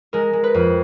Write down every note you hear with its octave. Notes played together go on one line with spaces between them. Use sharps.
G#3 A#4
G#3
B4
F2